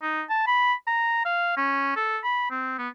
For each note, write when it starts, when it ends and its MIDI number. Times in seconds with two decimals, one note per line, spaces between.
0.02 0.23 63
0.29 0.44 81
0.47 0.73 83
0.87 1.20 82
1.25 1.57 77
1.57 1.96 61
1.96 2.18 69
2.24 2.48 83
2.51 2.76 60
2.78 2.88 59